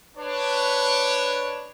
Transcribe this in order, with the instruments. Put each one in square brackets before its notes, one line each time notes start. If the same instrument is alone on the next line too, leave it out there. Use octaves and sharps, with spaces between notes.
[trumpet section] D4 C#5 [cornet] B4